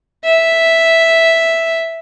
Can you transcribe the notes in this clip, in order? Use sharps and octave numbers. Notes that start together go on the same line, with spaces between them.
E5